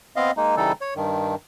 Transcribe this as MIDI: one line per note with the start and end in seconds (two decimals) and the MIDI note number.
0.16 0.31 59
0.16 0.31 60
0.16 0.31 75
0.16 0.31 77
0.37 0.56 56
0.37 0.56 58
0.37 0.56 63
0.57 0.72 49
0.57 0.72 52
0.57 0.72 55
0.57 0.72 63
0.57 0.72 69
0.81 0.94 73
0.96 1.35 43
0.96 1.35 51